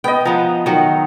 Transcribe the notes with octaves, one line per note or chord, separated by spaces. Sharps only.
B3 D#5 G5
F3 B3 A#5
D#3 F#3